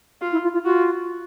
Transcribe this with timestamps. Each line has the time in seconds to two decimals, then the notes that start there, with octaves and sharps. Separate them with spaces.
0.21 F4
0.32 E4
0.43 F4
0.54 F4
0.64 F4 F#4